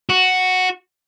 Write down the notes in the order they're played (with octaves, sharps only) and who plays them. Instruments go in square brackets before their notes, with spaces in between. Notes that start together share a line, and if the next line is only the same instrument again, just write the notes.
[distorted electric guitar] F#4